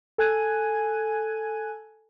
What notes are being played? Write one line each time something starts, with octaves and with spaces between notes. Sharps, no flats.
A4 G#5 F#6 G#6 D#7